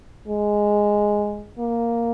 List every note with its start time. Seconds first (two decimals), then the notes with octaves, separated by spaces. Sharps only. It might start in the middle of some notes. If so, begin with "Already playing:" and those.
0.28 G#3
1.59 A#3